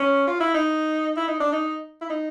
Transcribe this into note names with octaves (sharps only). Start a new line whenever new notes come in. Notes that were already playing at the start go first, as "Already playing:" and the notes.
Already playing: C#4
F4
E4
D#4
E4
D#4
D4
D#4
E4
D#4